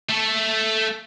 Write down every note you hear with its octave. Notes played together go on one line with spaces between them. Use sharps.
A3 A4